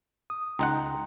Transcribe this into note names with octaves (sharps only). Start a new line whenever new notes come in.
D#6
C#2 D#4 F#5 G5 A#5 C6